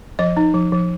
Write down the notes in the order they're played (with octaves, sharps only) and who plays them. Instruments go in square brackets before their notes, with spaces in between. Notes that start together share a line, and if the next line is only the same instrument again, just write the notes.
[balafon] F3 D#5
D#4
F3
F3